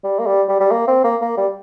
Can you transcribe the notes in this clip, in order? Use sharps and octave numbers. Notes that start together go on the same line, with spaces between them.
G3
A#3
G3
G3
G3
A#3
C4
A#3
A#3
G3